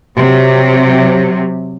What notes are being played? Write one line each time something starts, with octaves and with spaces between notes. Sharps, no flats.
C3 F#3